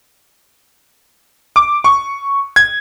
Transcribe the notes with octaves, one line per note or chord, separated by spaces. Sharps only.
D6
C#6
G#6